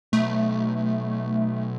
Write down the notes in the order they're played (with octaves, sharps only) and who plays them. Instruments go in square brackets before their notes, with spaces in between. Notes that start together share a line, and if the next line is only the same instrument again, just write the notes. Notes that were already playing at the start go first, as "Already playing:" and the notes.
[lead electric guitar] B1 [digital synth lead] A3